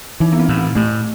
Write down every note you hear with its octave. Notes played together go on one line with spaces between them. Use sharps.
E3 D#4
B3
C4
A2
C4
A2 A3